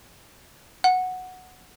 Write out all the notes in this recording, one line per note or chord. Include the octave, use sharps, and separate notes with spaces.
F#5